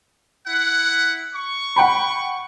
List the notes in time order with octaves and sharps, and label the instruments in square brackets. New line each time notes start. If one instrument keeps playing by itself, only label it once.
[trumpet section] E4 F#5
C#6
[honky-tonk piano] F#5 G5 B5